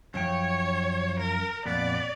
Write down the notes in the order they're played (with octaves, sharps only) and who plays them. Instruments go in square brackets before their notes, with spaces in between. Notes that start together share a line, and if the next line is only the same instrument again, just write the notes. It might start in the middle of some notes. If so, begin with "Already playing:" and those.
[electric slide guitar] F#2 F3 G5 [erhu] C#5
[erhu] A#4
[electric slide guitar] F2 A#2 B3 [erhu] D5